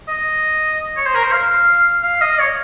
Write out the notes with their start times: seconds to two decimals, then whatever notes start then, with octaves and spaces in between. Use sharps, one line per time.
0.08 D#5
0.97 C#5
1.06 C5
1.15 A#4
1.23 C5
1.32 F5
2.03 F5
2.21 D#5
2.39 C#5